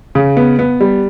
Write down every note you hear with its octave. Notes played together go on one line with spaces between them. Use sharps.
C#3
B3
B3
G3